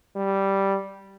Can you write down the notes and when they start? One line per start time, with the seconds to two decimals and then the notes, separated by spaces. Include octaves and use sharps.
0.16 G3